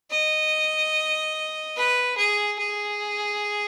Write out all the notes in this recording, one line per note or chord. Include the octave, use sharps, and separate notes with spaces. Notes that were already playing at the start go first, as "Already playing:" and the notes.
D#5
B4
G#4
G#4